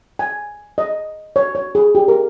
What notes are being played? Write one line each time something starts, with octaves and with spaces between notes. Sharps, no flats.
G#5
D#5
C#5
C#5
G#4
G4
A#4